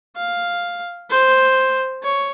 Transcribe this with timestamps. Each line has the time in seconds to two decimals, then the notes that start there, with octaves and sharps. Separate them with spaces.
0.17 F5
1.11 C5
2.03 C#5